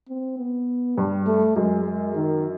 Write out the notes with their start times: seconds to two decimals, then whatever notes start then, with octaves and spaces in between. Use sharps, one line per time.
0.09 C4
0.39 B3
0.97 G2 G3
1.27 A3
1.56 F#2 G#3
1.85 G#3
2.15 D#3